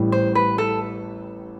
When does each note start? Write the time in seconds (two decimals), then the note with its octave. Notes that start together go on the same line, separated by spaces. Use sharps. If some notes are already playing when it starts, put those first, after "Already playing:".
Already playing: A1 A2 G3
0.12 C5
0.35 B4
0.58 A4